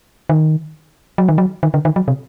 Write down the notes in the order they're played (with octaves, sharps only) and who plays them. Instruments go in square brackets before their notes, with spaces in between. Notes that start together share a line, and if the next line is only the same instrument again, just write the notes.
[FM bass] D#3
F#3
D#3
F#3
D#3
D3
D#3
F#3
C3